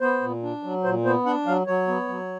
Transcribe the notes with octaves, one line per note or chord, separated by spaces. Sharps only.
B3 C5
A#2
D4
F#3
A#2 C5
B3 C5
D4 F#5
F#3 F5
F#3 C#5
B3
F#3